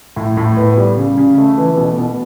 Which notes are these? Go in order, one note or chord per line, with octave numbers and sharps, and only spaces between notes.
A2
A2
B3
G3
C#3
C#3
A3
E3
B2
B2